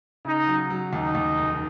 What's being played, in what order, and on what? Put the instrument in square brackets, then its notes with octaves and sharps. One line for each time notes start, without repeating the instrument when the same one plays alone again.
[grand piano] C#3 [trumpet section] D#4
[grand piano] F#3
F#3
[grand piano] D#2 [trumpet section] D#4
[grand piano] D#2
F1